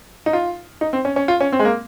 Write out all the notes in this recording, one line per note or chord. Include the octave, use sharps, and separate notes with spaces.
D#4
F4
D#4
C4
C#4
C#4
F4
C#4
C4
G#3
A#3